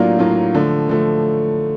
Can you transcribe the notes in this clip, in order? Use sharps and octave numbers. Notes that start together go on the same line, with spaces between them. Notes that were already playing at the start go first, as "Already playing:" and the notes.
Already playing: A2 F#3 A#3 D4 F4
A2 F#3 A#3 D4 F4
D3 F3 A3
D3 F3 A3